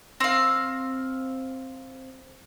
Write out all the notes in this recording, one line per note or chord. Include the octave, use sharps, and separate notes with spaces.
C4 F5